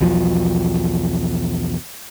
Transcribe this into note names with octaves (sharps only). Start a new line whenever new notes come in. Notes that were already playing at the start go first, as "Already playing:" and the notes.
B1 E2 F3 F#3